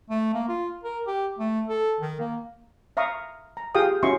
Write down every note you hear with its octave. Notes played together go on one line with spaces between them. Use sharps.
A3
A#3
F4
A#4
G4
A3
A4
D#3
A#3
E5 F5 A#5 C#6 D#6
A#5
F4 G4 G#4 F5 G5 D#6
C#4 E4 F#4 E5 C6 C#6